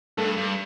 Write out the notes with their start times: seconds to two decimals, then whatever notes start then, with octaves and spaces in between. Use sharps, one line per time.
0.17 G2 A3 A4
0.37 G2